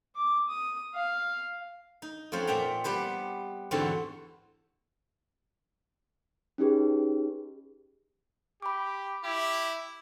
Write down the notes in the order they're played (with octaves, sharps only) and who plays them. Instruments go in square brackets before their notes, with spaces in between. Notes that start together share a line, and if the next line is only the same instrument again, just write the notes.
[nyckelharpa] D6
D#6
F5
[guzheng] D#4
F2 F3 C#4 C5 F#5
A#2 C4 E5 G5 A#5
G3 B3 G4 B4 C5
E2 G#2 D3 C4 F#4 A4
[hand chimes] C#4 D#4 G4 G#4 B4
[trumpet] G4 [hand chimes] B5 D6
[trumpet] E4 [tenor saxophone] G4